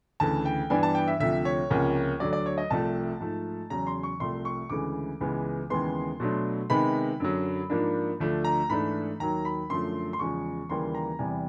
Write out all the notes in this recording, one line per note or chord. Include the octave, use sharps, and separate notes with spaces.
D2 C#3 E3 A5
G5
G2 E3 G3 B3 D4 G#5
A5
G5
E5
D2 C3 F3 E5
C#5
C#2 C3 F3 A#3 C#4
D2 D3 F#3 D5
D5
C#5
D#5
C2 C3 F3 A3 A5
G#2 F3 A3
E2 C#3 F#3 A#5
C6
C#6
C2 C3 F3 A3 C6
C#6
D2 C#3 E3 G#3 D6
C#2 C#3 E3 G#3 B3
D#2 C#3 E3 G#3 B3 C6
B2 F#3 A3 D4
C3 D#3 G#3 B3 D#4 B5
F#2 D3 F#3
G#2 F3 A#3 D4
D2 D3 F3 A3 D4
A#5
G#2 E3 A3 D4 B5
D#2 D#3 F#3 A#5
B5
F#2 D3 F3 A3 C6
C6
E2 C#3 F3 G#3 C#6
D#2 C#3 E3 G3 A#3 C6
A#5
E2 C3 E3 G3 G#5